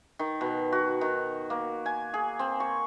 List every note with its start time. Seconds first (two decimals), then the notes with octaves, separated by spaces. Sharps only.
0.19 D#3
0.41 B2
0.72 F#4
1.01 D#3
1.50 A#3
1.86 G#5
2.14 G#4
2.39 C4
2.60 C#6